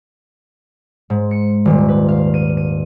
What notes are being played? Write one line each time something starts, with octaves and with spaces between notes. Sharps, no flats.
G#2
C#7
D#1
B4
F5
D#7
D#7